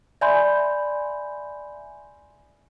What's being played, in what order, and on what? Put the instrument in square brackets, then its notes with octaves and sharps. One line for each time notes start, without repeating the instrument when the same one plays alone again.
[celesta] D5 E5 G#5 B5 C6 G6